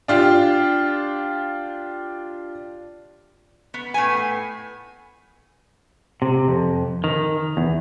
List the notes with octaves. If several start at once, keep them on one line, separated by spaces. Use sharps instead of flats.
D4 F4 G4
B3
A2 B3 G#5
C3
F2
D#3
E2